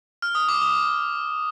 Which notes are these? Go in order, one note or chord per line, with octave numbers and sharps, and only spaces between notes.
F6
D#6
D6
D#6